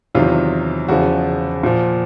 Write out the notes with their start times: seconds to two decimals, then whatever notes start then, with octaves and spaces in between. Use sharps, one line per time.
0.15 E2 C3 D#3 F#3 F4
0.88 E2 C#3 F3 F#4
1.63 A#2 F3